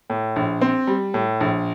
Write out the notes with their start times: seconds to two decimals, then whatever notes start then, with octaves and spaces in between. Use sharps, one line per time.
0.10 A2
0.36 A#1
0.61 C4
0.87 G3
1.14 A2
1.40 A#1